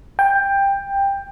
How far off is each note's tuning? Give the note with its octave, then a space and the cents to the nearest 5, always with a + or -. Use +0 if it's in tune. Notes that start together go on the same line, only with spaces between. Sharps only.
G5 +15